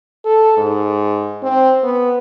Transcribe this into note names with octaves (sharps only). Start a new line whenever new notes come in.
A4
G#2
C4
B3